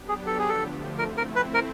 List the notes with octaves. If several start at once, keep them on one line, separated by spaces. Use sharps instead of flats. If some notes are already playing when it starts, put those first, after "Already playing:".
Already playing: F#3 B3 D4 G4
G#4
A4
G#4
D3 F3 A3 A4
A3 C4 E4 A#4
A#4
B4
A#4